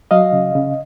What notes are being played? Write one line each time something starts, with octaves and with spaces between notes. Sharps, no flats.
F#3 D#5 F5
C#3
C#3